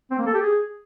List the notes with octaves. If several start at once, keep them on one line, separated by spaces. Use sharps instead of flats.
C4
A#3
A4
G4
G#4